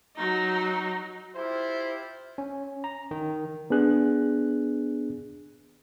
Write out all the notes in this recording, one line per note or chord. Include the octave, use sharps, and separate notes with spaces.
F#3 D#4
E4 F4 G4 C5
C#4
A#5
D#3
B3 D4 G#4 F#6